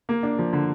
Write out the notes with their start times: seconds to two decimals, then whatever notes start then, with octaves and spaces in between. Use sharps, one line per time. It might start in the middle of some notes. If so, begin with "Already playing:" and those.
0.09 A#3
0.23 D4
0.39 F3
0.53 D3